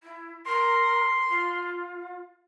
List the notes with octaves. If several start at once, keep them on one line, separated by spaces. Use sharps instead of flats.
E4
A#4 C6
F4